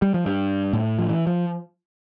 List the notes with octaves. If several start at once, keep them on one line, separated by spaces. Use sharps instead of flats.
G3
F3
G2
A2
F3
E3
F3